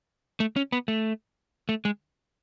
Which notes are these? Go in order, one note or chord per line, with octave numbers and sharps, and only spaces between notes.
A3
C#4
B3
A3
A3
G#3